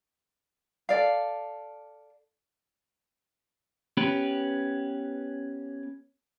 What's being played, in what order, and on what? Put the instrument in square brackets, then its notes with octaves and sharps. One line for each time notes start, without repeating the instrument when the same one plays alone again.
[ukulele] A4 D5 F5
[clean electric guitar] B3 C#4 G4 B4